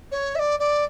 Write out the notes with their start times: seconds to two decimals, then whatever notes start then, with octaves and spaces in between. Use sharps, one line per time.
0.12 C#5
0.35 E5
0.39 D5
0.59 D5